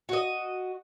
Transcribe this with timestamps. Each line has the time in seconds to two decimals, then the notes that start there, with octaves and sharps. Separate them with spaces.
0.09 F#4 D#5